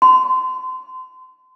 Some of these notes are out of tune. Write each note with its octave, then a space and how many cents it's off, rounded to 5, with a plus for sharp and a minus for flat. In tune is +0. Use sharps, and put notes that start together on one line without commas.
C6 -30